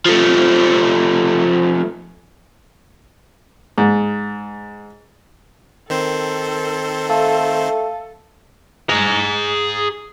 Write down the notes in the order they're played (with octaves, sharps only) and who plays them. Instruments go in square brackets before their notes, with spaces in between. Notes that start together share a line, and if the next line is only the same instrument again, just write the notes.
[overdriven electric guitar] F3 A3
[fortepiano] G#2
[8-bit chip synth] D#3 C4 C5 [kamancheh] A4 [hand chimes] A#4
[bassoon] A3 [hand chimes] F5 A5 E6
[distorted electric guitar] G#4 A#5